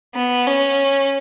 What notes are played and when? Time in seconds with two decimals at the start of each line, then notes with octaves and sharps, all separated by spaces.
0.15 B3
0.47 C#4